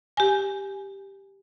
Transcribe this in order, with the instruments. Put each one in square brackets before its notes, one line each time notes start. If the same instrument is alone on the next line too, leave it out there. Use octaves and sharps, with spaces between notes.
[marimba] G4 G#5